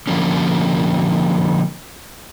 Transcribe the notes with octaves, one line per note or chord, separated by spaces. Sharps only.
D3 F3 G3 A#3 C#4